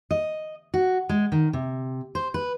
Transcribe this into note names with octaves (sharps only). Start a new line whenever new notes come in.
D#5
F#4
G#3
D#3
C3
C5
B4